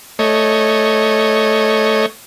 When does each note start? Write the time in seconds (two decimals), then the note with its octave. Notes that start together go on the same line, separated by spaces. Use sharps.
0.19 A3 C#5 D#5